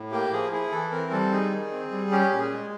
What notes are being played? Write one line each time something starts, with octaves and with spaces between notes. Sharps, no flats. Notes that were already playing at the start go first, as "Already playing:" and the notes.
Already playing: A2
A#3 G4
F3 G#4
E4 G#4
E3 A4
C4 A#4
G3 A4
D#4 G#4
D#3
C4
G3
C#4 G4
A#2
G#4
G#3